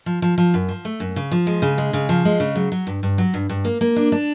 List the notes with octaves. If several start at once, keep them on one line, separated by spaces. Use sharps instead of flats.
F3
F3
F3
F#2
F3
A3
F#2
C#3
F3
G#3
C#3
G#3
C#3
F3
G#3
C#3
F#3
F#3
G2
G2
F#3
G2
G2
A#3
A#3
D4
D4